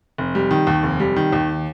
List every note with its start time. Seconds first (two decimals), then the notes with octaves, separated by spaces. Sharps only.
0.18 F1
0.35 G3
0.51 D#3
0.67 D#2
0.83 F1
1.00 G3
1.16 D#3
1.33 D#2